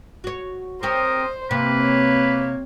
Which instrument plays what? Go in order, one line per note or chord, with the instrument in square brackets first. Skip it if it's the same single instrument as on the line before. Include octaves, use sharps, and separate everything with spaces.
[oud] F#4 C#5
[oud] C4 G4 C#5 [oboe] A#4 [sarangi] C5 [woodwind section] D#6
[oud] C3 [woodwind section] A#3 [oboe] B4
[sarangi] C#5